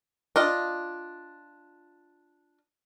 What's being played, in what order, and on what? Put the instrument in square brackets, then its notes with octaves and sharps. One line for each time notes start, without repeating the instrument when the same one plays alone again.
[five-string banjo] D4 F4 D#5